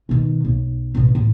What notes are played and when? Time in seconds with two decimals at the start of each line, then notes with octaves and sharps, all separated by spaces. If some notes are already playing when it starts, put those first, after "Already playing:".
0.09 B2 D#3
0.45 B1
0.95 A1 B2
1.15 A1